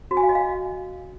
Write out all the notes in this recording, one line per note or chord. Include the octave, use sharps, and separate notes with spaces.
F#4
G#5
F5
D#5
F5